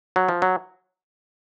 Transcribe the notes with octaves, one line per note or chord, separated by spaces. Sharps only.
F#3
F3
F#3